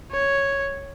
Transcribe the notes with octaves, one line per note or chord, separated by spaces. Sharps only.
C#5